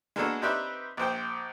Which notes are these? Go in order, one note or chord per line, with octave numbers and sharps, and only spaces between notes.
G#3 A#3 B3 D4 F#4 A4
C4 D#4 G4 B4 D5 E5
A#1 C5 G5